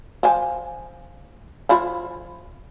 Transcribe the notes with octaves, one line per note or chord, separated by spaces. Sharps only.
F3 G#5
F3 E4 F4